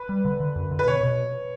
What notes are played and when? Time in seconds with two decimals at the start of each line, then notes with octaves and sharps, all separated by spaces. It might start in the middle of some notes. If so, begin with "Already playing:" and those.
Already playing: B4
0.09 G3
0.25 D3
0.40 D3
0.56 F#2
0.71 D3
0.79 B4
0.87 B2 C#5
1.03 B2